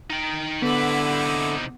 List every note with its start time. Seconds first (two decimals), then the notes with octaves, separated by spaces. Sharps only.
0.10 D#4 G5
0.62 D3 G3 B3 E4 B4 D6
1.26 C3 D#4